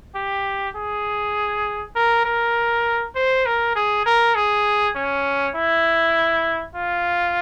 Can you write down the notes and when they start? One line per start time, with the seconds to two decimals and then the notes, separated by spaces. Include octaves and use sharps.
0.15 G4
0.76 G#4
1.96 A#4
2.26 A#4
3.15 C5
3.46 A#4
3.76 G#4
4.06 A#4
4.35 G#4
4.96 C#4
5.56 E4
6.76 F4